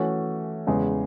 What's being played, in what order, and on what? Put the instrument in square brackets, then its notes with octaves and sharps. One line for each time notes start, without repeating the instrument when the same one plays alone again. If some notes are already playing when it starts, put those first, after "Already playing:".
Already playing: [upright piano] E3 A3 C#4 F#4 A4
E2 C#3 G#3